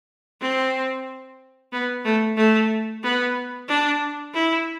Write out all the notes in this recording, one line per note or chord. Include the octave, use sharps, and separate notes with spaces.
C4
B3
A3
A3
B3
D4
E4